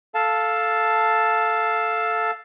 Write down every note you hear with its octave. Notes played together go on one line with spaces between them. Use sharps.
A4 F5 A5